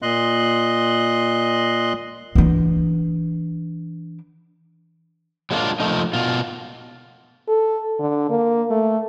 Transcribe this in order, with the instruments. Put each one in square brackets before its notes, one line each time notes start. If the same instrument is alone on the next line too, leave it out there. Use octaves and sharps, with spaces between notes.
[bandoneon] A#2 D#5 C6 F#6
[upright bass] E3 D4
[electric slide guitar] F#3 G#3 A#3 D4 F4
F3 A3 D#4
B2 F4
[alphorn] A4
D3
A#3
A3